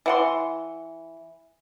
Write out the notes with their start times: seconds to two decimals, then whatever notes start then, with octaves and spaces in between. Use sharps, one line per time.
0.06 E3 F#5 C6